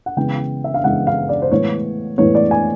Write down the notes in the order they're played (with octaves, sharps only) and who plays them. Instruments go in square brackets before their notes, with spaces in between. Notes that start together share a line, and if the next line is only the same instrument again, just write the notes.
[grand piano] F#5
C#3 E3 G#3 B3 G5
E5
F5
C#3 E3 G#3 B3 F#5
F5
D5
C5
A2 E3 G#3 B3 C#5
A2 E3 G#3 B3 C#5
D5
G#5